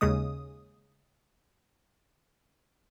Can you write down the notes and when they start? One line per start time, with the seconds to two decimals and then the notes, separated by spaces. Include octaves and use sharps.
0.01 D#2 C#3 G#3 D#6